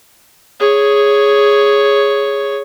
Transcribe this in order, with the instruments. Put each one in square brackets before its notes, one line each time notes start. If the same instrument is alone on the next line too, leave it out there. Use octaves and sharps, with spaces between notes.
[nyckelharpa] G#4 C#5